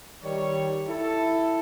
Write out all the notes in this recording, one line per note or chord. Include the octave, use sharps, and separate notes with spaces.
D#3 G3 C#5
E4 A4